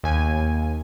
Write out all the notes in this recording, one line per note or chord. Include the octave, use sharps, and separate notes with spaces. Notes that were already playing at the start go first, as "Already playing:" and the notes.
D#2 G#5